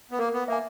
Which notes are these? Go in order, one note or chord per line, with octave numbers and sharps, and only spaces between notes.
B3
A#3 A#4
B3
A#3 E5 G#5